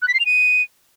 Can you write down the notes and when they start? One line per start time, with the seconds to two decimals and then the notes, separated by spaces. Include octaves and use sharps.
0.02 F#6
0.08 B6
0.14 C7
0.20 F7
0.26 D#7